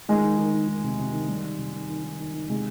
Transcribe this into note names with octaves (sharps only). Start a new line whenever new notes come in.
D#3 G#3
D#3
D#3
D#3
D#3
C3
C3
D#3
D#3 G3
D#3
C3
D#3
D#3
D#3
D#3
D#3
C3 G#3